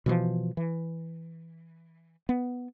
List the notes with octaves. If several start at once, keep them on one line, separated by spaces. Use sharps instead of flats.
B2 E3 F3
E3
B3